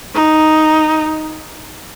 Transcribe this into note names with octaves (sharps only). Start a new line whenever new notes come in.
D#4